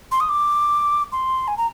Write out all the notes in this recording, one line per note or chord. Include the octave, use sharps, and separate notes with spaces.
C6
D#6
D6
C6
G#5
A#5